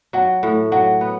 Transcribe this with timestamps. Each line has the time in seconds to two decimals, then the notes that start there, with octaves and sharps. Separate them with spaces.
0.13 F#3 F#5
0.43 A2
0.72 F#3 F#5
1.01 B3